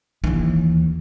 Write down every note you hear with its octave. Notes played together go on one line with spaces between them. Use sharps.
D#2 E3